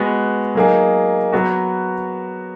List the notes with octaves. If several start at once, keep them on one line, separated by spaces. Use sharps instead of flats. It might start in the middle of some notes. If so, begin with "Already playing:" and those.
Already playing: G#3 B3 F#4
F#3 A#3 D#4 G#4
F#3 B3 F#4